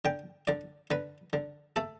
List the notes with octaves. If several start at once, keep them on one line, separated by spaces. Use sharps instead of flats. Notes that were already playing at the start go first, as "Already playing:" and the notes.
D3 G5
D3 D5
D3 B4
D3
A3 A4